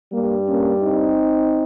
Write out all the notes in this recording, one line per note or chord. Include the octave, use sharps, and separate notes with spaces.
G2 G3 A#3
A#3 C#4
C4 D#4